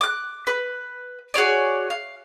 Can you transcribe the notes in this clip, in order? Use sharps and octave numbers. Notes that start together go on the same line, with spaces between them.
D6 F#6
B4
F#4 G#4 C#5 D5
F5